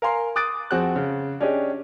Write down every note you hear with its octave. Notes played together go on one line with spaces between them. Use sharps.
A#4 F5 G#5 C6
D6 D#6 F#6 A6 D7
F2 C4 F#4 G#4 F#6
C#3
C#4 D4 G4 G#4 D#5